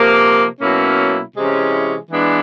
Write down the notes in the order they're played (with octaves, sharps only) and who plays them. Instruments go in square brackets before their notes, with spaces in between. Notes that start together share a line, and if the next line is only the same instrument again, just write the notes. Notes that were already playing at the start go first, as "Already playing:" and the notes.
Already playing: [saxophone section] C3 F3 A#3
B2 F#3 A#3 C#4 E4
C3 E3 G#3 C#4 E4
E3 G#3 B3 D4